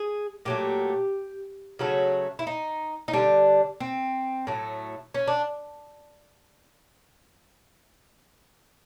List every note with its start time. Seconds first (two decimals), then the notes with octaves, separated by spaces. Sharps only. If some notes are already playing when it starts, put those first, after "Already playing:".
Already playing: G#4
0.45 A#2 F#3 A3 G4
1.79 C#3 F#3 A3 F#4
2.39 E4
2.47 D#4
3.08 D#4
3.13 D3 G3 D4
3.80 C4
4.47 A2 F#3 A3
5.14 C#4
5.27 D4